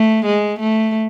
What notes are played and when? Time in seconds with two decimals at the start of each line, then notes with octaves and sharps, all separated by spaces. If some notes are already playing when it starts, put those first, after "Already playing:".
Already playing: A3
0.25 G#3
0.59 A3